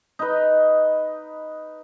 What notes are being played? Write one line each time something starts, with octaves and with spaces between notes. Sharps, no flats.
D#4 B4